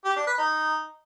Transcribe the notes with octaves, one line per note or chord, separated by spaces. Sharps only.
G4
D4
B4
D#4